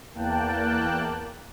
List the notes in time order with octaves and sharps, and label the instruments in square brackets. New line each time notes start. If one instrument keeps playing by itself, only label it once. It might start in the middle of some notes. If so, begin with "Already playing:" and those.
[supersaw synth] E2 A#3 G5 A5 F#6